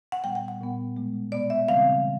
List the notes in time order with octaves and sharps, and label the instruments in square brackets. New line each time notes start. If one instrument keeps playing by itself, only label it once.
[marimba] F#5
A#2 G3 B3 G5
G5
F#5
A#2 G3 B3
B2 G#3 B3
B2 G#3 B3 D5
E5
C#3 E3 G3 C4 F5